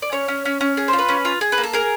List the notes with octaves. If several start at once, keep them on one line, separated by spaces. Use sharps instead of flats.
D5
C#4 C#5
C#4
C#4
C#4
G#4
C5
F4
B4
C#4
F4
G#4
B4
A#3
A4
G#4 A#4